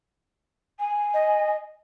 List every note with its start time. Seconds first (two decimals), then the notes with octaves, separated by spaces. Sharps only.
0.79 G#5
1.14 D#5